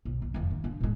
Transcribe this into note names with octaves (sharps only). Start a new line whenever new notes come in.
B1
E2
F1 E2
D#3
D3
A2 G#3